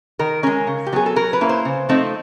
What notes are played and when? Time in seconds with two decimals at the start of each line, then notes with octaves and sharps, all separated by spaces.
0.19 D#3 A#4
0.43 G#3 C#4 A#4
0.67 C#3
0.87 G4
0.93 F#3 B3 G#4
1.06 A4
1.16 F#3 A#4
1.33 B4
1.41 A#3 C#4 E4
1.49 C5
1.65 C#3
1.89 F3 A3 C4 D#4